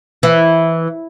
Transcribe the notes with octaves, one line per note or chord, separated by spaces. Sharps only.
E3